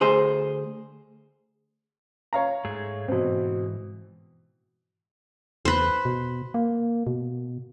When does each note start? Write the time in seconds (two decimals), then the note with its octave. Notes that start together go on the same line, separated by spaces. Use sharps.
0.01 D2 G#4 C5
2.33 C#5 F5 A#5
2.65 G#2 A3 G#4
3.08 G#2 B2 E3 C4
5.65 E2 B4 C5
6.05 B2
6.54 A#3
7.07 B2